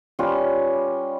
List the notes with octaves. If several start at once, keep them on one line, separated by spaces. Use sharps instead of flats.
G3 C#4 F4 B4